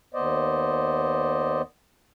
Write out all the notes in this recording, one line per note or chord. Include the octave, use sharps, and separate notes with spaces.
D#2 B3 C5 D5 D#5